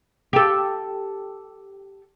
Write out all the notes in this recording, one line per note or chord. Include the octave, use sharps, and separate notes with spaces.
G4 A4